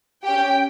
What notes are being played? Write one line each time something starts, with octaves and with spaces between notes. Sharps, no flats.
C#4 G4 G5